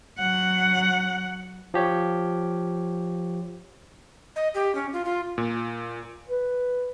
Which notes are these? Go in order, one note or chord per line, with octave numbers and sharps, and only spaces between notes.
F#3 F#5
F3 G4 C#5
D#5
G4
C#4
F4
F4
A#2
B4